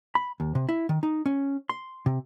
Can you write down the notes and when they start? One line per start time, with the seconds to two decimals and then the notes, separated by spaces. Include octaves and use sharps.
0.15 B5
0.40 D#2
0.55 C3
0.69 E4
0.89 D#3
1.03 D#4
1.26 C#4
1.69 C6
2.06 C3